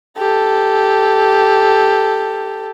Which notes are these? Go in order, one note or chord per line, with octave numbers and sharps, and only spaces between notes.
G4 A4